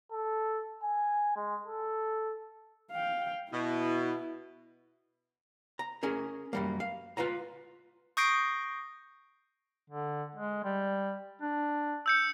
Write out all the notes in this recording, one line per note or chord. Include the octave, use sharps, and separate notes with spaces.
A4
G#5
G#3
A4
F5 G5
B2 E4
A#5
C#4 G#4 A#4
F#2 G3 A#3
F5
F4 B4 F5 A#5
C#6 D#6 G6 A#6 C7 D7
D3
G#3
G3
D4
E6 G6 C#7